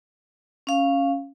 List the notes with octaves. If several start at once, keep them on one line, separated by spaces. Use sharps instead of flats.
C#4 F5